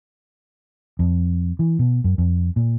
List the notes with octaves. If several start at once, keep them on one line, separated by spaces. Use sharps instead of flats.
F2
E3
B2
F#2
F2
A#2